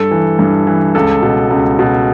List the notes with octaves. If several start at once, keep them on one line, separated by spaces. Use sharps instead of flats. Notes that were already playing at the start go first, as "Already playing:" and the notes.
Already playing: G2 A4
E3
G2
E3
C#2 A4
B2
C#2
B2